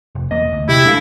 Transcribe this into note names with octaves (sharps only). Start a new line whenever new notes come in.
F1
E1 E2 A#3 D#5
D2
C3 E4 G4
G#3 D4 A4 F5